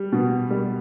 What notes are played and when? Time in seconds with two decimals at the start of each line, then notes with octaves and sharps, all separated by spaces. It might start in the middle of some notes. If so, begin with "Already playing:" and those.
Already playing: G3
0.12 B2
0.51 G3